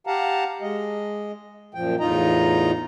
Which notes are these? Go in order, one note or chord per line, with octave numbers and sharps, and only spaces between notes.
G4 F5 F#5 A5 A#5
G#3 D#5
F#2 A#2 F3 G5
E2 A2 D#4 F4 D#5 A#5